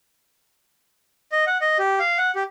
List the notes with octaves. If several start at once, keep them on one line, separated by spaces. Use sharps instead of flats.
D#5
F#5
D#5
G4
F5
F#5
G4